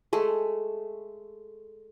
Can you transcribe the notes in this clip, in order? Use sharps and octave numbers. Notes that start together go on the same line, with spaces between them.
G#3 A3